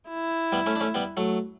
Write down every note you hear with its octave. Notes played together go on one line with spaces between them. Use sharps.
E4
G3 B3
A3 C#4
D4
A3 C#4
G3 B3
F#3 A3